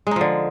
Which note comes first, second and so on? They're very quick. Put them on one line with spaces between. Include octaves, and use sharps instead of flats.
G#3 D#4 F3 D3